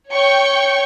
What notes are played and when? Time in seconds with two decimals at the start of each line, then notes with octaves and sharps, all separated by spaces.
0.13 C#5 G5 C#6